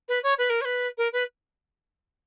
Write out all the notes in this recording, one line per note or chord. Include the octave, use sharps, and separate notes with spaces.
B4
C#5
B4
A#4
C#5
B4
A#4
B4